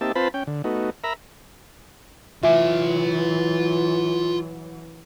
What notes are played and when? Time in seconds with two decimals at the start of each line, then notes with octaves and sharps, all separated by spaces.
0.01 A#3 C4 D#4 G4 E5 A5
0.15 C4 F4 B4 C5 A5 B5
0.34 C#4 G5
0.47 D3
0.64 A3 B3 D#4 F#4
1.04 A#4 E5 A#5 B5
2.43 E3 F#3 F4 E5 G#5